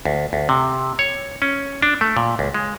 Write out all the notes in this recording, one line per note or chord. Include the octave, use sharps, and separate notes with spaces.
D2
D2
C3
C#5
C#4
D4
A3
A#2
C#2
G#3